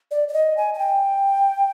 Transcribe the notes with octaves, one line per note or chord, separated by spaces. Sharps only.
D5
D5
D#5
G#5
G#5
G5